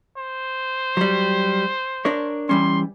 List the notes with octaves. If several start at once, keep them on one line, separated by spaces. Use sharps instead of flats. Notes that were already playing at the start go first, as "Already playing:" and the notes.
C5
F#3 G3
D4 A#4 C#5
E3 G3 C#4 C6